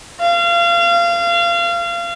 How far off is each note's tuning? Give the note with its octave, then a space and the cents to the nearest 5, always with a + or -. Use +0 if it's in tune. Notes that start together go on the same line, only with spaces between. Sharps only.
F5 -30